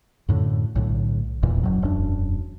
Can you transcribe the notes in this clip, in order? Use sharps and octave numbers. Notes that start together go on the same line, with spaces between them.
F#2 A2 D3
B1 A2 D3
E1 E2 A#2 E3
F#1 F#3
E1 F#2 D4